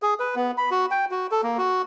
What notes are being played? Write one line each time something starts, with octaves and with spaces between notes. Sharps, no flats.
G#4
B4
B3
B5
F#4
G5
F#4
A4
A#3
F#4